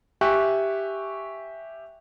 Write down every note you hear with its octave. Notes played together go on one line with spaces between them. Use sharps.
G4 E5 G#5 C#6 F#6